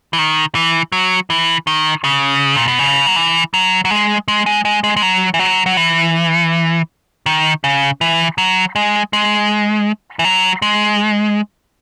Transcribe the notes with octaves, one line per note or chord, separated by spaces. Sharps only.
E3
D#3
E3
F#3
E3
D#3
C#3
A#2
B2
C#3
F#3
E3
F#3
F#3
G#3
G#3
G#3
G#3
G#3
G#3
F#3
E3
F#3
F#3
E3
D#3
C#3
E3
F#3
G#3
G#3
E3
F#3
G#3